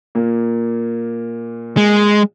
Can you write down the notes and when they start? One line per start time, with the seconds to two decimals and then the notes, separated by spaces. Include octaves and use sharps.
0.15 A#2 A#3
1.77 G#3